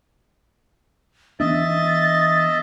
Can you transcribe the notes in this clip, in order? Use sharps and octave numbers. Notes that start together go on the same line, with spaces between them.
E3 B3 D4 D#5 E5 A6